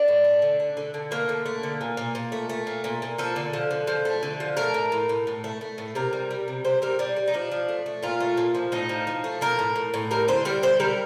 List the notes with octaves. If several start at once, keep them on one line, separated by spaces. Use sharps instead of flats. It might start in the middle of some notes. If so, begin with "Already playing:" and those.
Already playing: D4
A2
A3
D3
A3
D3
D3
A3 A#3
D3
A3
D3
A#2
A#2
A#2
A3
A3
A#2
A#2
A#2
F3 A4
D3
F3
D3
F3
A3
D3
F3
A3 A#4
A2
A2
A2
A2
A3
A3
A2
C3 A#4
G3
G3
C3
C3 C5
G3 A#4
G3 D4
G3
D#4
F3 D4
F3
A3
A3
A#2 F4
A3
A#2
F3
A2 D#4
F3
F3
A3
F3 A#4
A2
A2
A2
G3 A#4
D3 C5
G3 A#4
D3 C5
G3 A#4